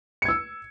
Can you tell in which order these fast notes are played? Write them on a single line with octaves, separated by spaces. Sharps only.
C#7 G#6 E6